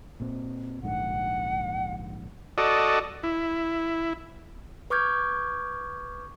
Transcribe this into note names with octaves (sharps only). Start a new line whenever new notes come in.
A#2 C4
A#1 G#2 D3 F#5
F#4 A4 D5 D#5
E4
B4 C#6 D6 F6 G6 G#6